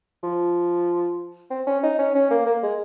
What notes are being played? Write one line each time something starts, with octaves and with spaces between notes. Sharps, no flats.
F3
C4
C#4
D#4
C#4
C#4
A#3
A#3
G#3